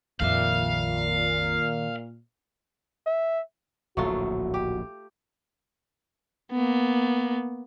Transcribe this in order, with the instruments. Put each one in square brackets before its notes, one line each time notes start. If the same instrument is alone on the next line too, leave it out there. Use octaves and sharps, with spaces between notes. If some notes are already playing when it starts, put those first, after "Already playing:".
[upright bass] A#1 F2 [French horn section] A#2 [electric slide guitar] D#3 E5 [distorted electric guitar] F5
[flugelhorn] E5
[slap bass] D1 A#1 [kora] F#3 A3 F4 [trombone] F#4
[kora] G4
[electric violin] A#3 B3